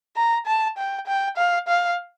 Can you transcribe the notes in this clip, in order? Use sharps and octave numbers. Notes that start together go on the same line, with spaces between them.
A#5
A5
G5
G5
F5
F5